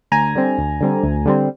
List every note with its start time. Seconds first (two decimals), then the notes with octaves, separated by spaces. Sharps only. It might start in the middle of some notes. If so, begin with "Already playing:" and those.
0.12 D2 G#5 A#5
0.35 D3 G3 C4
0.58 D2
0.81 D3 G3 C4
1.03 D2
1.26 D3 G3 C4